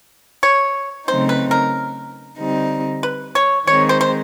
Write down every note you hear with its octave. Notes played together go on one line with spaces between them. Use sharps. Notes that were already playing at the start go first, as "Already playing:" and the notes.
C#5
C#3 F#3 A3 C4 D#4 C5
B4
A#4
D3 G3 C4 D#4
B4
C#5
D#3 G#3 C4 D#4 C#5
C5
C5